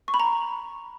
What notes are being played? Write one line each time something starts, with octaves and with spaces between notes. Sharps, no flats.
C#6
B5
A#5